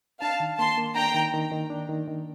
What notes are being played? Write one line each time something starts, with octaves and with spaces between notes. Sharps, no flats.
D4 F5 A5
D#3
A#3 A5 C6
A#3
D4 G5 A#5
D#3
D#3
D#3
D4
D#3
D#3